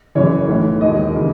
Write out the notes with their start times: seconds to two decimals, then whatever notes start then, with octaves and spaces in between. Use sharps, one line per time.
0.15 F#1 F#2 C#3 E3 C#5
0.48 B1 A2 E3
0.81 E1 D#2 D#3 D#5
1.15 C#3 E3